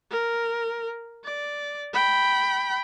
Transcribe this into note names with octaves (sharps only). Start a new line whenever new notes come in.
A#4
D5
G5 B5